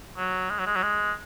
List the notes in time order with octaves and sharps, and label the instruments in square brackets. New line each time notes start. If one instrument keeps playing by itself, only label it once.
[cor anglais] F#3
G#3
F#3
G#3
F#3
G#3